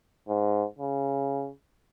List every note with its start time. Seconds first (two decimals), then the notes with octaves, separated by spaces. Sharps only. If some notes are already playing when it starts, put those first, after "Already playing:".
0.28 G#2
0.79 C#3